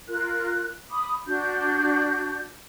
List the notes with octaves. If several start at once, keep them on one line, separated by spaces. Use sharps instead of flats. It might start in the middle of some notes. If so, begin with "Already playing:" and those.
F4 A#4 F#6
B5 D6 D#6
D4 F#4 G6